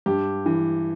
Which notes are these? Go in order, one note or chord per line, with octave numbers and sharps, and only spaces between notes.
G2 G4
E3